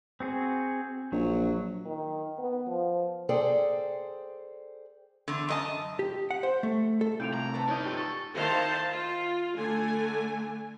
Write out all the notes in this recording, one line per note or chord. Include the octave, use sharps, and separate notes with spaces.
C4 F#4 G#4
A#1 F#3
D#3
B3
F3
G#4 A4 C5 D5 G5
E2 D3
F#2 D#5 A5
G4
F#5
C5
A3
A4
A2 C3 E4 F4 G6 D7 F7
A#5
A3 B4 D5
C#4 D#4 A#4 C#5 D#5 G6
G#2 F4 G4 A4
A4 C#6
D#3 E4 C5 F5 A5
F4
D3 A3 G#5